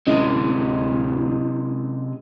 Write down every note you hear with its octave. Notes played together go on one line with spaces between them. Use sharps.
D1 C3 G#3 C#4 E4 D#5